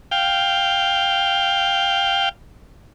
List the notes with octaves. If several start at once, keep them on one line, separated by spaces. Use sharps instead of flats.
F5 G5